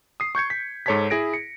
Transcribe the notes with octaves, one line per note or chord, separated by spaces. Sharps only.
D#6 C7
C#6 G6 G#6 C#7
B6
G#2 A4 C#5 A5 G#6 B6
E4 G#4 A#6 D7
C#7